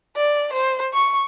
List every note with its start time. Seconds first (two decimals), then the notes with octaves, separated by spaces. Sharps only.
0.16 D5
0.53 C5
0.94 C#6